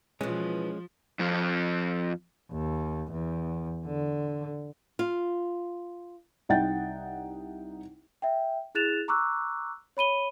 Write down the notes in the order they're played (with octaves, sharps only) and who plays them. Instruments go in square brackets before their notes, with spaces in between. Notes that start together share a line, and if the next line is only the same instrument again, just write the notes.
[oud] B2 E3 [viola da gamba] F3 [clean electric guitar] G#3 C#4
[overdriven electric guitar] F2 F3
[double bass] D#2
E2
D3
[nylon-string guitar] F4
[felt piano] C2 D#4 F#5 G5 A6
[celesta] E5 G5
E4 G#4 F#6 A6 E7 F7
A#5 C#6 D6 E6 F#6
C#5 B5 D#7 G7